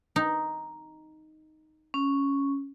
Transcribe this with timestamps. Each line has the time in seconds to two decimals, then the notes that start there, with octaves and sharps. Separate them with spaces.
0.16 D#4
1.94 C#4